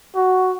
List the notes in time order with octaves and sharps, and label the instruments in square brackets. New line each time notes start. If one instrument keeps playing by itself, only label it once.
[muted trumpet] F#4